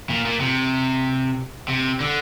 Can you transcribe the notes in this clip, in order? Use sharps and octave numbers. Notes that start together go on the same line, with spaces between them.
A#2
A#2
C3
C3
D3